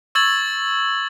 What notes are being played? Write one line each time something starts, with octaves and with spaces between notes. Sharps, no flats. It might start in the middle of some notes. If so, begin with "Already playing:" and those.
C#6 E6 G#6 A6 F#7